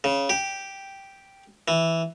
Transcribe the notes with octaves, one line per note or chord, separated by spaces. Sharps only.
C#3
G4
E3